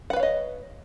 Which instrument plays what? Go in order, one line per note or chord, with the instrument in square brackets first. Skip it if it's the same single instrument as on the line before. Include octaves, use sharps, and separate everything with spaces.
[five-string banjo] F#5
B4
F5
C#5
D#5